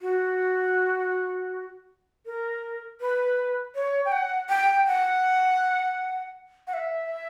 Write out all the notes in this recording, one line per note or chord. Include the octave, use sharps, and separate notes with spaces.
F#4
A#4
B4
C#5
G5
F#5
G5
F#5
F#5
E5